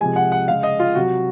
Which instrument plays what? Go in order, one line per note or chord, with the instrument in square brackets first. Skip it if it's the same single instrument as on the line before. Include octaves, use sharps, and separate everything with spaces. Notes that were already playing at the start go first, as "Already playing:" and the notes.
[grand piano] C3 F3 G#3 G#5
F#5
F#5
C#3 G#3 F5
D#5
F4
C3 F#3 F#4